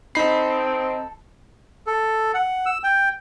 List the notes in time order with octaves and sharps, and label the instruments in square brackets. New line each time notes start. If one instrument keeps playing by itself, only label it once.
[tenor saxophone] C4 [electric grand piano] D#4 C7 [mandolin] A4 B5
[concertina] A4
F#5
E6
G5